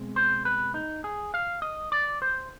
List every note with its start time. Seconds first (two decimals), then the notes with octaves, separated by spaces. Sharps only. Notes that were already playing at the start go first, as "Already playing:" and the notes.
Already playing: B2 G#3 C4
0.16 C5
0.45 B4
0.74 D#4
1.04 G#4
1.34 F5
1.62 D#5
1.92 D5
2.22 C5